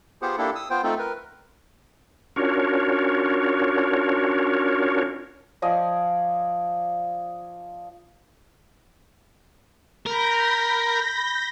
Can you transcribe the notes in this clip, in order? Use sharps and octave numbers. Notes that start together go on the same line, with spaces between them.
B3 F4 G4 G#4 C5 F#5
A#3 D4 E4 G4 A4
D#6 E6
B3 F4 C5 G5
A3 C4 D#4 F4 A4
A#4 B4
C#4 D4 F4 F#4 A#4 C#5
F3 D5 D#5 G#5
A#4 B5 G6 A#6